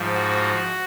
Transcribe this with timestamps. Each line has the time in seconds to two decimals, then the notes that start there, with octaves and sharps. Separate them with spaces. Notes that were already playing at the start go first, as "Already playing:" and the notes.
Already playing: G#2 F3
0.15 F#4